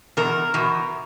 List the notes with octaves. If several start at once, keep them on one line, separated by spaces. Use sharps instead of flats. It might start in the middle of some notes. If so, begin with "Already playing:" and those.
E2 B2 A#4
E2 B2